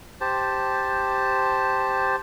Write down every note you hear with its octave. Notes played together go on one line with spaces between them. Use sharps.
G4 C5 A5